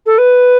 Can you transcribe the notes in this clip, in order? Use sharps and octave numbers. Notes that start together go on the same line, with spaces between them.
A4
B4